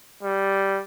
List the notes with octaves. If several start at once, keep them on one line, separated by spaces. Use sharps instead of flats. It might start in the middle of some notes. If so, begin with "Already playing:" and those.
G3